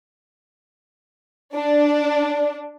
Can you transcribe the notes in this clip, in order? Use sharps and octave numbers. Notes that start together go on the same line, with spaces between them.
D4